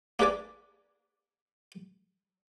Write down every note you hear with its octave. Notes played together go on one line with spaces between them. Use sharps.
A#3 D4 G#4 B4 D5 G#5